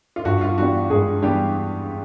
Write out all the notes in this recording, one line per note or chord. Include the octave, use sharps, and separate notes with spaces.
F4
G2 F#4
F4
E3 G3 B3 D4 F#4
G2 G#3 G#4
E3 G3 B3 D4 G4